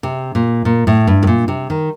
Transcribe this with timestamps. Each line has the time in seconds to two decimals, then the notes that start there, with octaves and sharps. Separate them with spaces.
0.03 C3
0.35 A#2
0.65 A#2
0.87 A2
1.07 G2
1.23 A2
1.27 A#2
1.48 C3
1.70 D#3